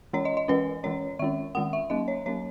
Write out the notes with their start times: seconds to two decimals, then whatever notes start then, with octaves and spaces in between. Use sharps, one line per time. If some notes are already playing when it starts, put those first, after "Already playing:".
0.13 E3 G#3 C#4 C#5
0.25 D#5
0.37 D#5
0.48 E3 G#3 C#4 B4
0.84 E3 G#3 C#4 C#5
1.19 D#3 G#3 C#4 E5
1.55 D#3 G#3 C#4 F#5
1.73 E5
1.90 F#3 A#3 C#4 D#5
2.08 C#5
2.26 F#3 A#3 C#4 C#5